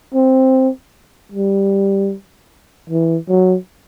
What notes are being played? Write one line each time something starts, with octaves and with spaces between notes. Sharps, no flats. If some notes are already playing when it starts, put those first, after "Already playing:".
C4
G3
E3
F#3